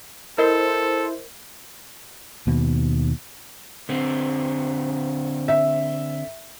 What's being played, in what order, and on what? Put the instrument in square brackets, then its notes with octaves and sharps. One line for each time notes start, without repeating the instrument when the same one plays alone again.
[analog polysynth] E4 C5 [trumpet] A4 [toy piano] A#4 D#5
[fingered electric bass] D#2 B2
[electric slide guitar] D3 C4
[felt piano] E5